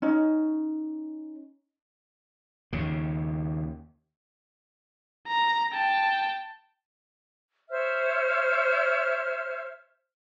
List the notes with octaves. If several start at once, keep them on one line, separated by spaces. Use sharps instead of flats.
C#4 D#4
D#2 C#3
A#5
G5 A5
C5 C#5 E5 F6